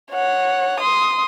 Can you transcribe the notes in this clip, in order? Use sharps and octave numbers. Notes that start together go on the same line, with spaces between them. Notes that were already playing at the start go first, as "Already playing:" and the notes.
C#5 F#5
C6 D#6